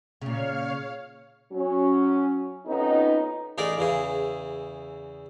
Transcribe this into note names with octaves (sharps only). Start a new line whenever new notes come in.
A#2 C#3 C#5 F5 F6
F#3 C#4
F2 B3 C#4 D#4
A1 D#4 G#4 A#4 D5
E2 C#3 E3 G#4